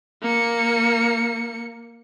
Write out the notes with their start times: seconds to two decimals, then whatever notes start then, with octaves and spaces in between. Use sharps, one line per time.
0.22 A#3 C#7